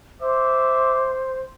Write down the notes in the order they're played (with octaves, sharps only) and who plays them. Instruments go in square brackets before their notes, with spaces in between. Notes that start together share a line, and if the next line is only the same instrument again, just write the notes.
[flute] C5 [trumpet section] E5 D6